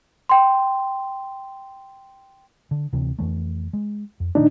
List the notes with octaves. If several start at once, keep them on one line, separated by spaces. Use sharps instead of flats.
G5 C6
D3
D2 C3 E3
F2 E3 A3
G#3
F2
A#2 D#3 A3 D4 D#4